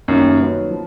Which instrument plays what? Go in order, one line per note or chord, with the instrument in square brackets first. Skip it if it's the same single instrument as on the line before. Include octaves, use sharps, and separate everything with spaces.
[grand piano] F#2 [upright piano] D#3 G3 A#3 C#4 F4
[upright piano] D#3 F#3 B3
F3